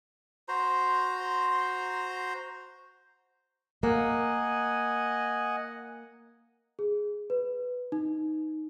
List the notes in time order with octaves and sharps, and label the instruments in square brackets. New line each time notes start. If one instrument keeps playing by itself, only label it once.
[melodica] F#4 C5 A#5 C6
[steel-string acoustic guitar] A#3 [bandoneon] D#5 F#5 G#5
[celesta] G#4
B4
D#4